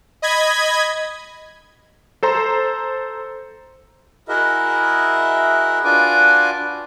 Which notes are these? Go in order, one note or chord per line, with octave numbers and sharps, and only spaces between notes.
D#5 B5 G#6
A4 C5 A#5 C6
E4 F#4 G#4 A#4 D#5 E5
D4 F4 F#4 B4 G#5 D6